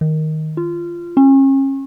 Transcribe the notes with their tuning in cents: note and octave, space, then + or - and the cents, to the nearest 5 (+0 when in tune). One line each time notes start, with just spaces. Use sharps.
D#3 +5
F4 -20
C#4 -35